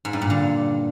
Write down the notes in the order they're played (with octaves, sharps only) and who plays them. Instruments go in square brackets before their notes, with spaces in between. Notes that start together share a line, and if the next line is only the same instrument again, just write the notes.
[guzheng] G#2
G2
A#2
D3